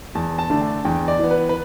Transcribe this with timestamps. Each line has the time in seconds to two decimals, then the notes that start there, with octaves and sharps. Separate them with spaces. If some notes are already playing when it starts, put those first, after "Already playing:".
0.15 E2 A5
0.39 A5
0.50 D3 A3 D4
0.62 A5
0.85 E2 G5
1.08 D5
1.19 E3 B3
1.31 B4
1.49 B4